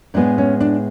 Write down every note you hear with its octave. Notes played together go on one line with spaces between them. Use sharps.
A2 G#3 B3 D4
C#4
D4